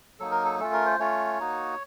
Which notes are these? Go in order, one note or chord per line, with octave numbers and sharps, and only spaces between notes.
F#3 A#3 D#4 A4
A#4
A4
A3 C#4 F4 A4
A#4
C5
A3 C#4 F4 C#5
A#3 D#4 F#4